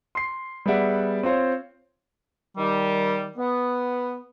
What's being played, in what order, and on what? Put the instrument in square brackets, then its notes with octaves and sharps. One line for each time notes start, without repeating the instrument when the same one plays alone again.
[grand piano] C6 C7
G3 B3 G#4 D5 E5 F#5
C4 F4 C5 C#5
[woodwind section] D#3 G3
B3